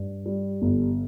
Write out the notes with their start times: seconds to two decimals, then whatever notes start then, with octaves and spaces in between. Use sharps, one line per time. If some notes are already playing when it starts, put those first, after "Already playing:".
Already playing: G2
0.26 G3
0.62 G1